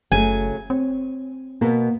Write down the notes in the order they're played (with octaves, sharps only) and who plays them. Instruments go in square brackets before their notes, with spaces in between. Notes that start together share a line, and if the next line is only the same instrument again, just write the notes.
[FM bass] F#1 [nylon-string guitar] C#3 F#3 A3 [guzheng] G#5
[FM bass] C4 [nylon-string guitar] C#5
[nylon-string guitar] B2 B3 A#4 [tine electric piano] A#3